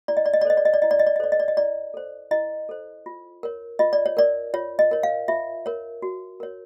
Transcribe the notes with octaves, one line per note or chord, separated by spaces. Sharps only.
E4 D5
D#5
D5
D#5
D5
A4 C5 D#5
D5
D#5
D5
E4 D#5
D5
D#5
D5
D#5
A4 C5 D5
D#5
D5
D#5
E4 D5
A4 C5
E4 D#5
A4 C5
F4
A#4 C#5
F4 D#5
D5
C#5
A#4 C#5 D5
F4 C#5
D#5
A#4 C#5
F5
F4 E5
A#4 C#5
F#4
A#4 C#5